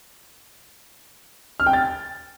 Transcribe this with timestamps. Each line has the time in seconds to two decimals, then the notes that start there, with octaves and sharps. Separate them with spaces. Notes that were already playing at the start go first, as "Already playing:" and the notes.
1.60 F6
1.66 G5
1.73 A6